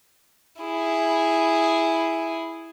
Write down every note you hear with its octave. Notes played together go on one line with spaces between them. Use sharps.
E4 G#4